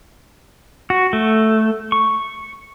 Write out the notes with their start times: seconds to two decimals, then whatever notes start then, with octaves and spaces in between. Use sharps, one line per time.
0.90 F#4
1.13 A3
1.92 C#6